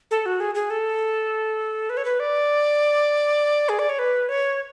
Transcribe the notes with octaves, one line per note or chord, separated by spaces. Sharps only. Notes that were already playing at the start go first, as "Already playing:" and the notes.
A4
F#4
G#4
G#4
A4
B4
C#5
B4
D5
G#4
D5
C#5
B4
C#5